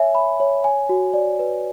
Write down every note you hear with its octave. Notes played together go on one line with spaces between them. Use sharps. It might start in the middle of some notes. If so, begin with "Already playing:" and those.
Already playing: C#5 E5 G#5
B5
C#5
G#5
F#4
D5
B4